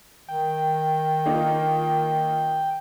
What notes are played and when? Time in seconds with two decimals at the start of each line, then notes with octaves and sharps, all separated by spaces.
0.29 D#3 G5
1.26 A#3 D#4 F4